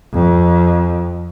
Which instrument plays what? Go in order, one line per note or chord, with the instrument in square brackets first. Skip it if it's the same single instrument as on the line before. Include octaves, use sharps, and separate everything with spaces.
[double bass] F2